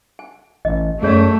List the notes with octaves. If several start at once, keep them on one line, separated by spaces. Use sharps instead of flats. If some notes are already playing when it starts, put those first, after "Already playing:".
G#5
A1 D#5
F#2 A3 G#4 C#5 D5